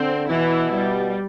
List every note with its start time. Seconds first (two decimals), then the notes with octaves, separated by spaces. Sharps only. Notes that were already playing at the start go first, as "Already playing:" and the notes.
Already playing: D3 C4
0.29 B2 E3 E4
0.72 G3